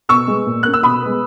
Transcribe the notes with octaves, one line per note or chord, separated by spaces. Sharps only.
B2 C#6 E6
G#3 B3
A#2
A#3 C#4 F#6
E6
B2 B5 D#6
G#3 B3